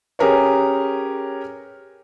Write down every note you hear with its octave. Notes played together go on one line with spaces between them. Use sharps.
C#4 G4 G#4 A#4 B4 C#5